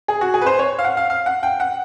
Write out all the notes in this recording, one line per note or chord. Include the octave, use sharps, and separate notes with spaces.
G#4
F#4
G#4
B4
C5
C#5
F5
F#5
F5
F5
F#5
G5
F#5